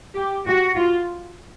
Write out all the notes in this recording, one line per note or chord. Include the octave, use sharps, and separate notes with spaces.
G4
F#4
F4